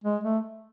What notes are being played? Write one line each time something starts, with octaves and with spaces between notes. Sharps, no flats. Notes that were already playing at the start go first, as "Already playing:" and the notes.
G#3
A3